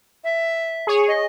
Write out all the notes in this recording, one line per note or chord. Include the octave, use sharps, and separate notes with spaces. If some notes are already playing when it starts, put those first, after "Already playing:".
E5
G#4 C#5
D#5